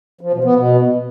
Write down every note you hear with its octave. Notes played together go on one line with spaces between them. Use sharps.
F3
B2
B3
B2